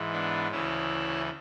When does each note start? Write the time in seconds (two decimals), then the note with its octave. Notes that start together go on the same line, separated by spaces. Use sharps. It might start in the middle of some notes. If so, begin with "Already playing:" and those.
Already playing: G#2 E3
0.13 B3 D4
0.51 D2 C#3 E3 C#4 E4